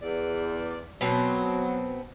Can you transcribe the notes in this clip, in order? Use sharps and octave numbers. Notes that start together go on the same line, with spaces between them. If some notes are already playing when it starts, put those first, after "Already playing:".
E2 D5
B2 F#3 B3 C4